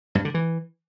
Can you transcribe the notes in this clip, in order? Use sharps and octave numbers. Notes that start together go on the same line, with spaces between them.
G2
D3
E3